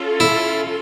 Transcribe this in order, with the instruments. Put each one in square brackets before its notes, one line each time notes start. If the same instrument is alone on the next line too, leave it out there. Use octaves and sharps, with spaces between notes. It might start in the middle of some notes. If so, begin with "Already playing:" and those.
Already playing: [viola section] C#4 F4 A4
[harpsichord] E4